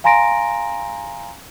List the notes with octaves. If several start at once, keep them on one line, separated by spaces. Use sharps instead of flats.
F5 G#5 A#5 C6 A#6 D7